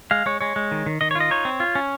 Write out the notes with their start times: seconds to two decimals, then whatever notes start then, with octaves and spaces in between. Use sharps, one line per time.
0.11 G#3 F5
0.26 G#3 C#5
0.41 G#3 C#5
0.56 G#3
0.72 D#3
0.86 D#3
1.01 D#3 D#5
1.11 C#5
1.15 F4
1.20 D#5
1.31 D#4 C#5
1.45 C4
1.60 F4
1.75 C#4